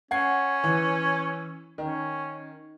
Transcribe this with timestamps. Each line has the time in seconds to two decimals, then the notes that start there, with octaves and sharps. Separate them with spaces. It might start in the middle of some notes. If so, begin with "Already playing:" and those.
0.11 C#4 F#5 G#6 C7
0.64 E3
1.78 D#3 C#4